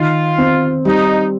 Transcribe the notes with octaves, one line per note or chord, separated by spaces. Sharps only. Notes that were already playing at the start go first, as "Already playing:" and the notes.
Already playing: D#3 F4
C4
G3 D#4